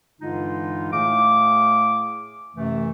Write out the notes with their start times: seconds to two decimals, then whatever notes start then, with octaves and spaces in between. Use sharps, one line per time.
0.21 G2 D3 E3 G#3 D#4 F4
0.92 A2 A3 G#4 F5 D6
2.55 F#2 C3 E3 A3